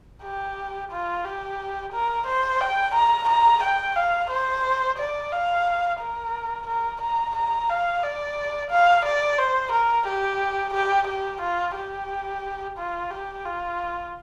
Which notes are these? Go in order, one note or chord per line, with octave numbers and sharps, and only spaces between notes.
G4
F4
G4
A#4
C5
G5
A#5
A#5
G5
F5
C5
D5
F5
A#4
A#4
A#5
A#5
F5
D5
F5
D5
C5
A#4
G4
G4
G4
F4
G4
F4
G4
F4